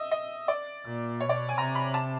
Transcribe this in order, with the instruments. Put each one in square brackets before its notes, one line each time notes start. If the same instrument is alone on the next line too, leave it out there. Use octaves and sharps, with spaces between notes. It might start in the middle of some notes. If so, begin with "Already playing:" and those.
Already playing: [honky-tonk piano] D#5 E5
D#5
D5
[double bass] A#2
[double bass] B2 [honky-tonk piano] C#5
[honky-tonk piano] D5
G#5
[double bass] C3 [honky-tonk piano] A#5
[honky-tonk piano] B5
A5